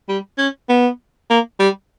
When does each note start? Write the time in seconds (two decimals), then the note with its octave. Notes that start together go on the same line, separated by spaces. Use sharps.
0.09 G3
0.38 C#4
0.69 B3
1.30 A#3
1.59 G3